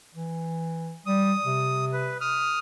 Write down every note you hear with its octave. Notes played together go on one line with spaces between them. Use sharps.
E3
G3 D#6
C3
B4
D#6 F6